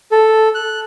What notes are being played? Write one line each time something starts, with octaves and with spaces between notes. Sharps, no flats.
A4
F#6